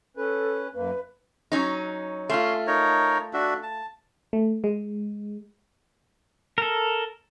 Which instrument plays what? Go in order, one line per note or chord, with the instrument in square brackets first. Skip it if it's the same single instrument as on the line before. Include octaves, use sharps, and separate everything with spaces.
[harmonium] C#4 B4 [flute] A4
[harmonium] F#2 A#3 [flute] B4
[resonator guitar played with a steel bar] F#3 C#4 D#4
[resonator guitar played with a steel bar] A3 F4 [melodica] C#4 C6
[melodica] D#4 A#4 C#5
D4 F#4 E5
A5
[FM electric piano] A3
G#3
[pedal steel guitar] A4 A#4